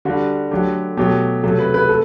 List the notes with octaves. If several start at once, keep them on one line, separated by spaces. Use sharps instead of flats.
D3 G3 F#4
D3 F#3 A3 G4
B2 F#3 A3 G4
C3 F#3 A3 A4
B4
B4
A3 A4